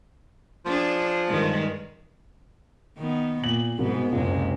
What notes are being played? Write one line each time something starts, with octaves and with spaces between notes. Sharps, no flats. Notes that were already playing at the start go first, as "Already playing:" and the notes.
F3 D4 G#4
G2 D#3 G#3
D#3 B3
A#2 F#7
C2 G#2 B2 B3
F#1 C#2 C3 G#3